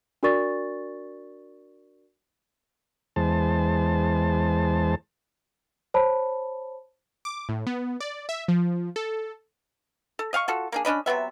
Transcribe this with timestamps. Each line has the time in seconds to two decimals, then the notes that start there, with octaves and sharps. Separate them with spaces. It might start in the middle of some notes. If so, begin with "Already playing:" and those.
0.23 D4 F#4 A#4 D5 C#6 A6
3.16 E2 G#3 C5 A5
5.94 C5 C#5 A5 B5
7.25 D6
7.49 A2
7.67 B3
8.00 D5
8.29 E5
8.48 F3
8.96 A4
10.19 A4
10.33 D#5 F5 F#5 C#6
10.48 F4 F#4 A4
10.72 A#3 D4 G#4
10.85 C#4 D4 D#5 B5
11.06 C3 F#3 B3 E5